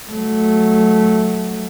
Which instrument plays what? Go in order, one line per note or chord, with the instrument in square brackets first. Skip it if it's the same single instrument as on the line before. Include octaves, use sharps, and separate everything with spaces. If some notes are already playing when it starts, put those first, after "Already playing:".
[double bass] F#3 A3